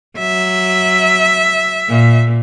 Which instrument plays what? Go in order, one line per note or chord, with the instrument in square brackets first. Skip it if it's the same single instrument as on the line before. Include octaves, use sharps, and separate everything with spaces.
[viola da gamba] F#3 [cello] E5
[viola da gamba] A#2